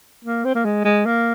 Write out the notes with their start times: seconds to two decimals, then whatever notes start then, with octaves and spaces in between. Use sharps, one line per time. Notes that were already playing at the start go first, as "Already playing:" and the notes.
0.25 A#3
0.45 C4
0.55 A#3
0.65 G#3
0.85 G#3
1.06 A#3